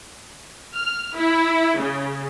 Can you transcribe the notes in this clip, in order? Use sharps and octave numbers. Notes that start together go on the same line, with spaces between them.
F6
E4
C#3